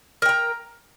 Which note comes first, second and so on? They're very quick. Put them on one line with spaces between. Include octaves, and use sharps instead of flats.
A#4 G5 A#5